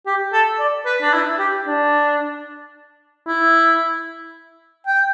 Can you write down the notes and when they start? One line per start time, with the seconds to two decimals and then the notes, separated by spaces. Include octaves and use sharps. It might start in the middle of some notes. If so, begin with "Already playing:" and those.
0.06 G4
0.33 A4
0.59 D5
0.85 B4
1.02 D4
1.13 E4
1.39 G4
1.67 D4
3.27 E4
4.87 G5